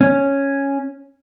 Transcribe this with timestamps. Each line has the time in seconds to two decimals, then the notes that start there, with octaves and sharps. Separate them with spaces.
0.01 C#4